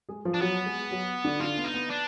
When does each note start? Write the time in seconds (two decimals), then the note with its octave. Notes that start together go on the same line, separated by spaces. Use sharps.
0.09 G#3 G#4
0.25 F3 F4
0.34 D4
0.41 F#3 B3 F#4
0.66 G#3 G#4
0.91 F#3 F#4
1.24 D3 D4
1.40 D3 D4 F4
1.57 B3
1.65 D#4
1.74 B3
1.90 D4